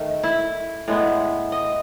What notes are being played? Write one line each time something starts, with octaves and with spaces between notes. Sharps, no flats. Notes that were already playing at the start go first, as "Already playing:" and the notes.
Already playing: D#3 A3
E4
A2 G#3 B3
D#5